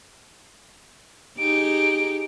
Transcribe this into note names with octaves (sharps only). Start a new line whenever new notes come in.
D#4 G4 G#4 D7